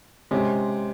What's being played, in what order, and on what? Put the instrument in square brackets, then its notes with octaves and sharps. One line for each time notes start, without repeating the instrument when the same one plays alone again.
[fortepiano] C3 [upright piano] G#3 C#4